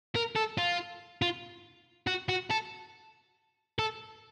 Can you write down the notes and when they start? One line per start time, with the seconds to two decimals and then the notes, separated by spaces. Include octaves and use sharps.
0.15 A#4
0.35 A4
0.58 F4
1.22 F4
2.07 F#4
2.29 F#4
2.50 A4
3.79 A4